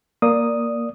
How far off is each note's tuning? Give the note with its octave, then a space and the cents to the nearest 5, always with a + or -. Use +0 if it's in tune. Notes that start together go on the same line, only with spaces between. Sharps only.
A#3 +0 D5 +0 D#6 +0